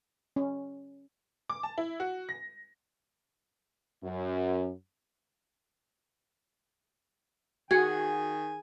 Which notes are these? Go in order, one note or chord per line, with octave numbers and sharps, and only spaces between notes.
C#4
D6
A5
E4
F#4
A#6
F#2
D#3 F#4 G#4 F#5 G#5 G#6